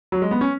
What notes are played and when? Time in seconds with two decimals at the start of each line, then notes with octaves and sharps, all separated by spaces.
0.12 F#3
0.22 G#3
0.31 B3
0.41 C#4